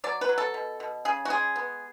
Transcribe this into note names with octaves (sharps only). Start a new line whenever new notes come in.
F#3 D5
B4
F#3
A4
B2
B2
C#3 G#4
F#4
G#3 G#4
B3